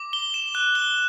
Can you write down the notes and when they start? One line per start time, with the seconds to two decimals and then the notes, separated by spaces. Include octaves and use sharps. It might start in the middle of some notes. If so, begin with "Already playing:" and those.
Already playing: D6
0.13 G7
0.34 E7
0.55 F#6
0.75 G7